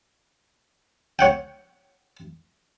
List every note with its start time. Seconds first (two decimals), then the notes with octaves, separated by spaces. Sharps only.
1.19 C#5 F#5 G5